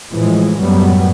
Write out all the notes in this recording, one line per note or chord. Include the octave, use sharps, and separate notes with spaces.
A2 E3 F3 G#3
F#2 A2 F#3 G3 B3